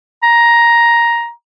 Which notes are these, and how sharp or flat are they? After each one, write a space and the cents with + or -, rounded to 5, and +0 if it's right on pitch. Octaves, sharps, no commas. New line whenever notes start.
A#5 +10